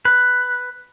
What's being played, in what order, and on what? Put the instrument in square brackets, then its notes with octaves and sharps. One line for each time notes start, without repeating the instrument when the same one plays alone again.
[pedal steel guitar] B4